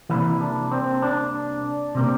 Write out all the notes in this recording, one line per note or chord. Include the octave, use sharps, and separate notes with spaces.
C3 E3 G3 A#3 E4
D4
C4
D4
C3 G3 A#3